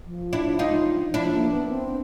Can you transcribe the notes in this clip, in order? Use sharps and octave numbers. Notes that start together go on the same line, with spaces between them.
F3
D4 E4
D#4 F4
F3 D4 E4
A#3
B3
C4